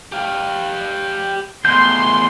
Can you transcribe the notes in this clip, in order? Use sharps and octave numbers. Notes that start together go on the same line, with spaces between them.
G4 F5
E2 A2 C6 G6